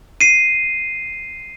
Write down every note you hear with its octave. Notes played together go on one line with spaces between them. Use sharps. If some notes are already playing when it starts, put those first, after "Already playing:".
C7 D#7